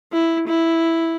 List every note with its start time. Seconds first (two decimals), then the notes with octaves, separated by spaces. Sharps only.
0.13 E4
0.48 E4